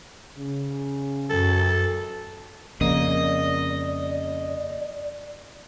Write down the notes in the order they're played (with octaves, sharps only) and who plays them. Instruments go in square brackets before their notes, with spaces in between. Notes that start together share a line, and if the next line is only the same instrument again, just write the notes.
[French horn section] C#3
[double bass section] F#2 [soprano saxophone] A4
[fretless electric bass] F2 C#3 A#3 [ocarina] D5 [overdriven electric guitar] D#5